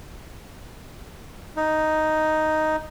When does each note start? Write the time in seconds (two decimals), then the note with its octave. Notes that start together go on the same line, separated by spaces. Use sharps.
1.57 D#4